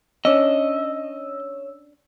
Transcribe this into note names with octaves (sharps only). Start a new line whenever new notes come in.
C#4 D4 C#5 D#5 E6